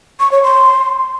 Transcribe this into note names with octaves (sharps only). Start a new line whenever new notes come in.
C#6
C#5
C6